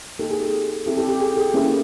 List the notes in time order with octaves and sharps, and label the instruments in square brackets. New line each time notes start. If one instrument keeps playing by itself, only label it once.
[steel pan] A#3 D#4 G4 A4
G#4
G4 A4
C4 E4 G4 A4
G4 A4
G4
G#4
G4 A4
A#3 C#4 E4 G4 G#4